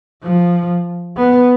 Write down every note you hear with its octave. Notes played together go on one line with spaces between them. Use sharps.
F3
B3